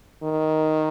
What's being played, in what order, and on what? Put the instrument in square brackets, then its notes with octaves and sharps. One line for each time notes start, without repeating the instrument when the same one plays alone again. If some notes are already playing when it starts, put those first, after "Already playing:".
[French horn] D#3